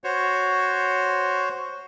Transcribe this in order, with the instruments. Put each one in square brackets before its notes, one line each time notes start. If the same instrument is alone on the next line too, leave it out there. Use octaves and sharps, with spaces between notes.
[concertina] F#4 C5 C#5